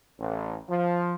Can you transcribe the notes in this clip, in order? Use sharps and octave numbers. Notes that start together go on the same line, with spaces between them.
A1
F3